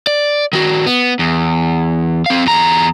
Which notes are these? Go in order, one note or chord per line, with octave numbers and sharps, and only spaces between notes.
D5
D#3 F#4
B3
E2
C4 F5
E2 A#5